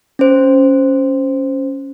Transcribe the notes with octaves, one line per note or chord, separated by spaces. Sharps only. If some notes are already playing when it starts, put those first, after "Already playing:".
C#4 C5